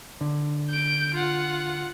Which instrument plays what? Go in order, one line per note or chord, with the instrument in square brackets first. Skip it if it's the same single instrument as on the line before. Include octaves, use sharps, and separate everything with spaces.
[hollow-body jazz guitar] D3
[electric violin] G6 D7
F4 F#5